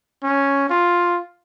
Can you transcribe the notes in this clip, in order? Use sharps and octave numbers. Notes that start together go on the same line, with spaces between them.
C#4
F4